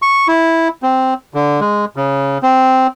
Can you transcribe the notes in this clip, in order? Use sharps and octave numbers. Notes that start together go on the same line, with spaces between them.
C#6
E4
C4
D3
G#3
C#3
C4